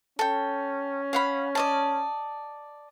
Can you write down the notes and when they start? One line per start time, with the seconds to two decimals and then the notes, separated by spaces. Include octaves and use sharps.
0.19 C#4 A4 G5
1.13 F5 F#5 B5
1.55 D5 D#5 A5